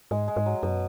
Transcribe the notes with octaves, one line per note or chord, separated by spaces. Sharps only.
G#2 G#3
G#3
G#2
F#3
F#2 B2